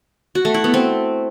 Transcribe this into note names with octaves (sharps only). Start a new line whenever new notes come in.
F#4
A3
E4
B3
C4